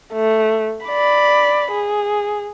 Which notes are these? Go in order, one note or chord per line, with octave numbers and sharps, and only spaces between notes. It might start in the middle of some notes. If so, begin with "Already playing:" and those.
A3
D5 B5
G#4